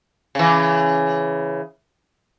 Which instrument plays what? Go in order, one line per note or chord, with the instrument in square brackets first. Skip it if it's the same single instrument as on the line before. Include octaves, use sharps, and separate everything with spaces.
[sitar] C#3 E3